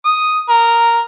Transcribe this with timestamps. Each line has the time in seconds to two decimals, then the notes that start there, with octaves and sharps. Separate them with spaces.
0.05 D#6
0.49 A#4